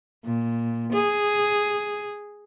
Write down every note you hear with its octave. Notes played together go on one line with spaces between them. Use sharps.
A#2
G#4